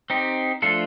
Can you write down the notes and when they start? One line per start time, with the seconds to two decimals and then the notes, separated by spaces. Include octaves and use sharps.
0.10 C4 D#4 G4
0.62 F3 A3 D4 F4 A4